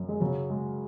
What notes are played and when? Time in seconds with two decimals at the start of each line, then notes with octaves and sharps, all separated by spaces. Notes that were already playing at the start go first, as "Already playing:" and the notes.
Already playing: F#2
0.09 G#3
0.20 C#3 F#3
0.50 G#3